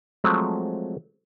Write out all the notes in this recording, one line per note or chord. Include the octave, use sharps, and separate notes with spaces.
F3 F#3 G#3 A3 C4